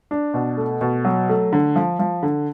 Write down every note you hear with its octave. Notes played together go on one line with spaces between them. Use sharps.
D4
B2
A3
B2
F#3
A3
D3
F3
F3
D3